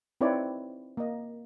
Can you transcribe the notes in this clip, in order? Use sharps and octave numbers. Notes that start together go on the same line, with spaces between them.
C4 D#4 E4 B4 C#5 D5
A#3 D#5